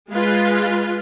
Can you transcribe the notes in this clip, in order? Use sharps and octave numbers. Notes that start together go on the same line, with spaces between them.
G#3 F4 B4